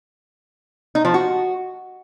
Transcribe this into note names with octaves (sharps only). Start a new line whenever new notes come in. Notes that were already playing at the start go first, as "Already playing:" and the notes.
D#4
F3
F#4